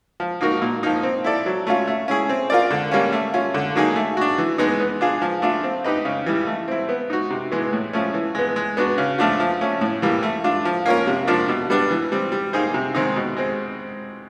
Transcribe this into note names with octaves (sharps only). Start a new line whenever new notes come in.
F3
A#3 D#4 F#4 A#4
A#2
F3 A#3 D#4
C4
E4 A4 D5
F#3
A3 C#4 F4
A3
C#4 E4 G#4
C4
F4 A#4 D5
D3
G3 A#3 C#4
A3
C#4 F4
D3
F#3 A#3 D#4 G#4
A3
D4 F#4
E3
G#3 B3 D#4
B3
D4 F4 G#4
F3
A3 D4 F4
C4
D#4 G4 B4 D#5
C#3
E3 G3
A3
C4 E4
B3
D#4 F#4
C3
E3 G#3 B3
A2
F3 A3 C#4
E3
G#3 B3
G#3
B3 D4 F#4
C#3
F3 A3 D4 F4
F3
A3 C#4
A2
E3 G3 A#3
A3
D4 F4
F3
A#3 C#4 F4 A#4
C3
F3 A#3 D4 F4
B2
G3 B3 D4
E3
G3 C4
G3
A#3 D#4 G#4 C5
C3
D#3 G#3 C4 D#4
B2
G#3 C4